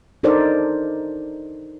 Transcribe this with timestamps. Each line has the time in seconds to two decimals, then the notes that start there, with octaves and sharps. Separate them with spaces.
0.23 D4 D#4 A4 A#4 C5 D5